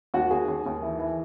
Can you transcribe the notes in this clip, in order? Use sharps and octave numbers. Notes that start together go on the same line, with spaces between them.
D#2 F#4
D#2 G#4
D#2
D#2
E3
E3